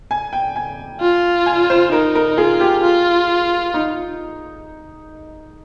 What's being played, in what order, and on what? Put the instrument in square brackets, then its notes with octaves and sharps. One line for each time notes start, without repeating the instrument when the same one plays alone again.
[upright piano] G#5
G5
G#5
[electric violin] F4
[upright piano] G#5
C5
[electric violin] D#4 [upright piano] A#4
[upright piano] A#4
[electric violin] F4 [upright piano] G#4
[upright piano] G4
[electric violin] F4
[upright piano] D#4